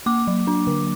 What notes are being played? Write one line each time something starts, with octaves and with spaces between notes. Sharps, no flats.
A#3 D6
F#3
D4
D3